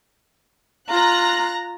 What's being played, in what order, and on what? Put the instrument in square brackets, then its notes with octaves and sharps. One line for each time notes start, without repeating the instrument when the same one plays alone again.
[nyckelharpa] F4 [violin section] A#5 F#6 A#6